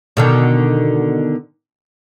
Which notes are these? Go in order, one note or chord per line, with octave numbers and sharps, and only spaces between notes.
B2 D3 D#3